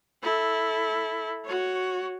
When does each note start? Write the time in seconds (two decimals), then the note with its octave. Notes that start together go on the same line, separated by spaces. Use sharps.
0.23 E4 A4
1.45 F#4 C#5